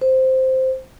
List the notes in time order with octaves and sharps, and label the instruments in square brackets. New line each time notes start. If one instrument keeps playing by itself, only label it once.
[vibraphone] C5